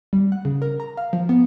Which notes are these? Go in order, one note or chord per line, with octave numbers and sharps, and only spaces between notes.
G3
F#5
C#3
A#4
A#5
F5
F3
B3